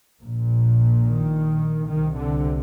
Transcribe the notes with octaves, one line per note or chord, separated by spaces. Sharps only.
A#1 A#2
D#3
C2 C3 D#3
D3